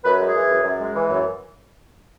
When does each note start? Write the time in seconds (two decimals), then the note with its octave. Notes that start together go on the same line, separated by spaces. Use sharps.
0.04 F#2 B4
0.20 G#3
0.27 G#4
0.34 E3
0.49 F#2
0.64 F#2
0.79 G#3
0.94 E3
1.09 F#2